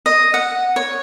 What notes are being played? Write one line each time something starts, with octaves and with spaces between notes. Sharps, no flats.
D#5
F#5
C#5